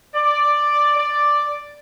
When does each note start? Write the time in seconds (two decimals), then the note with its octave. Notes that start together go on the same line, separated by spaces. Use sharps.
0.14 D5
0.97 D5